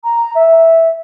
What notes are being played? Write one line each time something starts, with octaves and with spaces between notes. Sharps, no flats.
A#5
E5